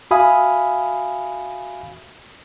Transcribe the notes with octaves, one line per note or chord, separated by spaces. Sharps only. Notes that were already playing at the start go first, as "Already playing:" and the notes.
F#4 E5 F5 G#5 B5 D#6